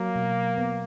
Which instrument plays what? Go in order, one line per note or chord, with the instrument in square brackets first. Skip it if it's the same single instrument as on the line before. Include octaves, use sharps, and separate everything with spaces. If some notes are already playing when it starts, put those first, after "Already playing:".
Already playing: [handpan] F#3 [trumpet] A#3
[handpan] B2
B3